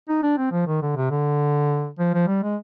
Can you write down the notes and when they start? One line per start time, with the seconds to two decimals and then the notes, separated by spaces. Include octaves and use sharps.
0.09 D#4
0.23 D4
0.38 C4
0.52 F3
0.67 D#3
0.82 D3
0.96 C3
1.10 D3
1.99 F3
2.14 F3
2.27 G3
2.43 G#3